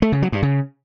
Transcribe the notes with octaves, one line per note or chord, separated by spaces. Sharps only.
A3
C#3
F#3
G2
C#3